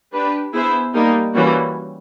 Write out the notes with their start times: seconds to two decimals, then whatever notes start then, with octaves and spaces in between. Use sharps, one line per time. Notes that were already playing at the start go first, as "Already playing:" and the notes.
0.13 D4 G4 B4
0.53 B3 E4 G#4 C5 E5
0.94 G3 A#3 D#4 G4 A#4
1.34 E3 G3 A#3 C#4 F#4